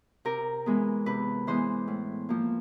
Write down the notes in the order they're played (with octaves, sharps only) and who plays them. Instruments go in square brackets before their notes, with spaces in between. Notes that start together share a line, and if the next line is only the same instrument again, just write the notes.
[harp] C3 A#4
E3 G#3 B3
C3 B4
E3 G#3 B3 C5
A2
F3 A#3